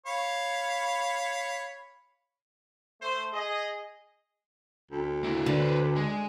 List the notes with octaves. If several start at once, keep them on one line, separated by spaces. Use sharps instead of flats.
C#5 F5 B5
A3 C5
G#4 D#5
D2
A#3 E4
D3 B4 C5
G#3